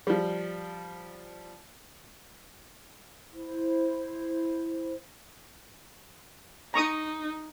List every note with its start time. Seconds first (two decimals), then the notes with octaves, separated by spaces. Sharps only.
0.07 F3 G3
3.33 E4 C5
6.74 D#4 A#5 C#6 D#6